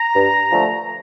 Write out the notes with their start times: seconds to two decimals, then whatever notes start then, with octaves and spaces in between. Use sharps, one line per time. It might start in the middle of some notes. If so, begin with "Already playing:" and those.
Already playing: A#5
0.13 G2
0.51 D3 F3 A3